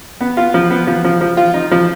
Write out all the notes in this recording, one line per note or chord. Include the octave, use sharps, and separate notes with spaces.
B3
F4
F3
B3
F3
F3
F3
F4
D#4
F3